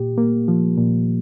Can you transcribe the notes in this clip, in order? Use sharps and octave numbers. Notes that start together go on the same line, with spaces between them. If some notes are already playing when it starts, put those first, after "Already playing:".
Already playing: A#2 G4
A#3
F3
A#2